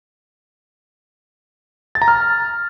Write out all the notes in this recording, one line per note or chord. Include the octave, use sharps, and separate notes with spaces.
A6
A#5
F6